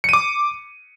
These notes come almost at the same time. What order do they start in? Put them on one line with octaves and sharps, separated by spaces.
C#7 D#7 D6